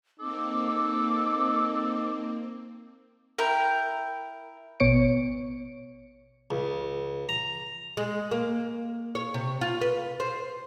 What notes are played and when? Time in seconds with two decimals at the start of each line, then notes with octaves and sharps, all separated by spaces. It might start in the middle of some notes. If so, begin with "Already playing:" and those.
0.20 A#3 C4 D#4 A4 D6
3.38 E4 A#4 G5
4.80 A1 B2 B3 C#5 C#7 D7
6.51 C#2
7.29 A#5
7.97 G#3
8.31 A#3
9.15 C#5
9.34 C3
9.61 F4
9.81 B4
10.20 C5